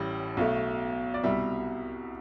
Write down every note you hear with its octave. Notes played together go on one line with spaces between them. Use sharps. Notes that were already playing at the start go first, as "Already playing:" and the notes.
Already playing: A1 A2 G3
B1 B2 A3
D5
C2 B2 G3 E5